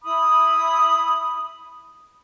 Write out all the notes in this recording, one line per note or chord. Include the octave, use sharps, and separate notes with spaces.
E4 B5 D#6